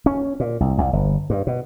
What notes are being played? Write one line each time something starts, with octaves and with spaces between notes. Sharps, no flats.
C#4
A#2
C2
C2
G1
G2
B2